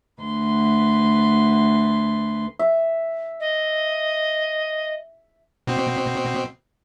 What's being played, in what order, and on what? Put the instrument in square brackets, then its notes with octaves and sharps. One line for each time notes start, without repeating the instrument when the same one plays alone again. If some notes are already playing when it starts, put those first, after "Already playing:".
[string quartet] D2 B4 C6
[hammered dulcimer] E5
[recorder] D#5
[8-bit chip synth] B2 C4